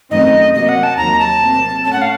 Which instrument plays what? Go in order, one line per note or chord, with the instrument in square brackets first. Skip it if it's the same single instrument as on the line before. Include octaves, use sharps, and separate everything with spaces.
[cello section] F#2 D#3 A3 C4 D#4 [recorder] D#5
[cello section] C3 F#3 A#3 [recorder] D#5
[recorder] F#5
A5
[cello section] D#2 D#3 F#3 [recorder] A#5
[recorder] A5
[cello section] C3 F#3 A#3
[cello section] A2 A3 C#4 [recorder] A5
[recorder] F#5
F5